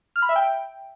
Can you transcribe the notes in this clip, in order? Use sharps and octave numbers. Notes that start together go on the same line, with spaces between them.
F6
B5
E5
G5